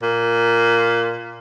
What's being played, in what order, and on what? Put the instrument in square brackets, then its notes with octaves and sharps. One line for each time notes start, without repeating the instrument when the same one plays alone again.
[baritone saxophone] A#2